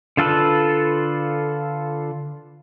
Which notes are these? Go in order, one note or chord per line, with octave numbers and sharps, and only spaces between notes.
D3 F4 A4 B4